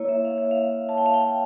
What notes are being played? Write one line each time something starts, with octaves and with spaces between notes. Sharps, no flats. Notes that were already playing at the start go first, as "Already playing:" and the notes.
Already playing: A#3 E4 C#5
E5
F5
E5
F5
A5
G5
F5
G5